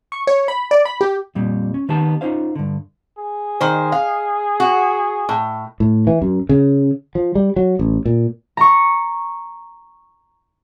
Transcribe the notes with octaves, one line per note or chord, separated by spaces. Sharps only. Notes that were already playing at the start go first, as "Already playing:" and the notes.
C#6
C#5
B5
D5
B5
G4
F2 A#2 G3
C#4
D#3 B3 D#4 G4 A5
C#4 D#4 F4 C5 F5
G2 D3
G#4
D#3 C5
F5
F#4
A2
A2
E3
F#2
C#3
F3
G3
F#3
A1
A#2
A#5 C#6